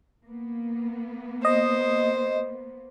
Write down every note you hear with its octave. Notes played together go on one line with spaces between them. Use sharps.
A#3 B3
C5 D#5